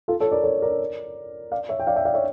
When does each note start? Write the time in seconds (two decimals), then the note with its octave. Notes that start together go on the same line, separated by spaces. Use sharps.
0.08 F4 A4
0.20 A4 C#5
0.32 A#4 D5
0.44 A4 C#5
0.62 A#4 D5
1.52 D5 F5
1.69 C#5 E5
1.80 G5
1.87 D5 F5
1.96 E5 G5
2.05 D5 F5
2.14 C#5 E5